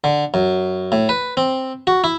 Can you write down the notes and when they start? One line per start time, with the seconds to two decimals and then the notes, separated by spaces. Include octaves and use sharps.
0.04 D3
0.34 F#2
0.92 A2
1.09 B4
1.37 C4
1.87 F#4
2.04 E4